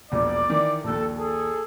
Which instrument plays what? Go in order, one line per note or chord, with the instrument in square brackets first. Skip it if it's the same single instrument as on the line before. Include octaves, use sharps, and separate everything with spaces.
[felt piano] E1 A#1 [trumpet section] D5
[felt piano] D#3 E3
[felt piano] A#1 D#2 [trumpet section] A4
[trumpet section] G#4 A4